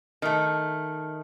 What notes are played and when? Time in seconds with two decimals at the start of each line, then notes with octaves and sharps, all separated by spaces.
0.22 D#3 A3